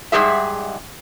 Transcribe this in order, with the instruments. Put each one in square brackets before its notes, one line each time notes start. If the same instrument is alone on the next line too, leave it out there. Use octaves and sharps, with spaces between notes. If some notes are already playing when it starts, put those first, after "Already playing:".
[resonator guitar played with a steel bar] G#2 G3 G#4 E5